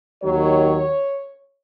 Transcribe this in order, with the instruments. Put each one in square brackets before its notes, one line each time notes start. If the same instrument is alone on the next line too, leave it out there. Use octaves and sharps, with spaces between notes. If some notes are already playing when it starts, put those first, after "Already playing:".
[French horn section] D#2 D#3 F#3 C#5